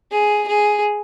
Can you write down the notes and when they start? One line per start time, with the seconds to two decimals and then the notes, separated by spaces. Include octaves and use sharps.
0.12 G#4
0.48 G#4